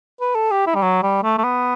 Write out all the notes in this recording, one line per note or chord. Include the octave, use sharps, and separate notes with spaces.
B4
A4
G4
E4
G3
F#3
G3
A3
A3
B3